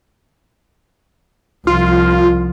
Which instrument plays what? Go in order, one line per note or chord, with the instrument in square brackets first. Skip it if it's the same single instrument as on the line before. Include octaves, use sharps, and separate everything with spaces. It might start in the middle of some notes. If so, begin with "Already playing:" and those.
[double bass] C2 F3 [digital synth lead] F4